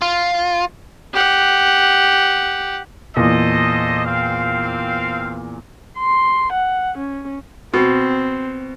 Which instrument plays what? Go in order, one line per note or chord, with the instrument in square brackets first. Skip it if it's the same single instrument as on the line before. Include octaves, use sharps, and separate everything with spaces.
[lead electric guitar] F4
[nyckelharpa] G4 F#5
[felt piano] E2 A#2 [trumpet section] A4 C5 D#5
[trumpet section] C4 F5
[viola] C6
F#5
C#4
[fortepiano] B2 [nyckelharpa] C4